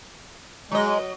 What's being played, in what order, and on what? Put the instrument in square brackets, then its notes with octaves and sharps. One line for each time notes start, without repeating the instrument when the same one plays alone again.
[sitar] F#3 D#5 [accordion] G#3